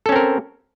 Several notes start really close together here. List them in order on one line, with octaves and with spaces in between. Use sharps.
A4 C#4 C4 A#4